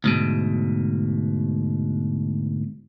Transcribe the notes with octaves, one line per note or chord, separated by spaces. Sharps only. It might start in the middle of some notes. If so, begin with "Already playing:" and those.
D2 G#2 B2